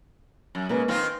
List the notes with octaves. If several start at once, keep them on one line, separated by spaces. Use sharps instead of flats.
F#2
C#3 G#3 A#3 B4
D#3 C4 F4 F5